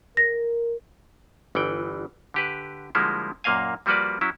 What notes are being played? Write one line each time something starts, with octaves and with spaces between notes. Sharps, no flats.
A#4 A#6
G1 E3 F#5 G5
D3 G4 B4
D3 F3 G3 G#3 A#3 E4
F#2 A#2 A#3 D#5 F5 G#5
F3 G3 A#3 F#4 B4 D5
F#3 C#4 E4